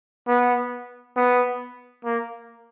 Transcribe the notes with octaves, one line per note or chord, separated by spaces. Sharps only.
B3
B3
A#3